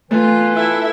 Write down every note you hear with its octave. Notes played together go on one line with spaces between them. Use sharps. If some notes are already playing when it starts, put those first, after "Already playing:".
E3 A3 F4
E4 A4 E5